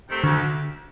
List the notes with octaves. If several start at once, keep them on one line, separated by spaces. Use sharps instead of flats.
C3 D#3 A3 C4
D2 D3